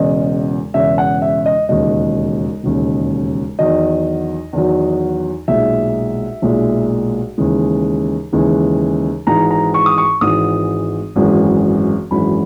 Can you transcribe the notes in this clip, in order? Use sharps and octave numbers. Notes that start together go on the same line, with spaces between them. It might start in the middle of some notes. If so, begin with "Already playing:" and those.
Already playing: E1 E2 C#3 D#5
E1 E2 C#3 E5
F#5
E5
D#5
E1 D#2 C#3 D#5
E1 D#2 C#3
E2 D#3 F#3 D#5
E2 D#3 F#3
B1 A#2 G#3 E5
B1 A#2 G#3
D#2 C#3 E3 G#3
D#2 C#3 E3 G#3
G#1 G#2 E3 G#3 A#5
A#5
C#6
D#6
C#6
G#1 G#2 E3 G#3 D#6
G#1 F#2 E3 G#3
G#1 F#2 E3 G#3 B5